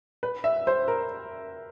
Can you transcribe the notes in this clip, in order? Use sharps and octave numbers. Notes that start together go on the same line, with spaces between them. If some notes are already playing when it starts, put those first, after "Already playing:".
B4
E5
C5
A#4